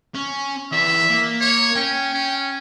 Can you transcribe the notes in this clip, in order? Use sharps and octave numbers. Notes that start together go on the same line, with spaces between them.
C#4
E3 D5 E5
A#3
C#5
C#4 G5
C#4